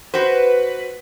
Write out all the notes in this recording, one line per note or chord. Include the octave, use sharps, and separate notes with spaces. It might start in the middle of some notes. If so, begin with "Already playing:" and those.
F#4 B4 C5